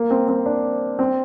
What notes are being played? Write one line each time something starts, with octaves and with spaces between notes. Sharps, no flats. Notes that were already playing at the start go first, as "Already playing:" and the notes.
Already playing: A#3
C4
C4
D4
C4